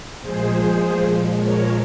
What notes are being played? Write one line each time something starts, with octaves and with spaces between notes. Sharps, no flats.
A#2 F3 G#3 G#4 C5
A#4 C#5